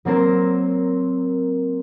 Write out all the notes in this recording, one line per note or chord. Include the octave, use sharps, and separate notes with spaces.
F#3 A#3 C4 A#4 C5